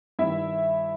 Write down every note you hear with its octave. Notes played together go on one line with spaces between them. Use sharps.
G2 D#3 E4 E5